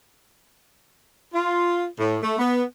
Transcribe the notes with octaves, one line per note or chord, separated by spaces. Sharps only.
F4
A2
A3
B3